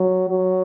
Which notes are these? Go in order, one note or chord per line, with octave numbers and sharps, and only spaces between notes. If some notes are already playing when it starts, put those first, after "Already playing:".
Already playing: F#3
F#3